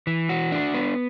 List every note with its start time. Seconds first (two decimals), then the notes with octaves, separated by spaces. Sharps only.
0.07 E3
0.29 F#4
0.52 D4
0.74 B3